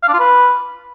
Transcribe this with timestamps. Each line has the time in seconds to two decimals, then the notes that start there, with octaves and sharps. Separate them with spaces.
0.03 F5
0.08 D4
0.14 F4
0.19 B4